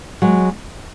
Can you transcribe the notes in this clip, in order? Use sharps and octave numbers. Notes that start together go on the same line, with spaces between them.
F#3 G#3